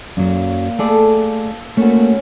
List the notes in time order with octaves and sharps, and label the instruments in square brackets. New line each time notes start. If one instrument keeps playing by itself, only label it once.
[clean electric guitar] F#2 F#3 [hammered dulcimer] A#2
[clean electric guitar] A3 G#4 D5 [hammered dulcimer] A4
[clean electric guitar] A3 F#4 [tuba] A#3 [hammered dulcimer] C#4